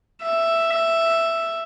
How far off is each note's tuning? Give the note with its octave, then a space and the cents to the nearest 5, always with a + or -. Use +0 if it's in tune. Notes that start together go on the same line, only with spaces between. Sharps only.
E5 +5